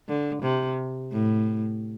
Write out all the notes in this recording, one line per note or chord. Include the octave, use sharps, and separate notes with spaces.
D3
C3
A2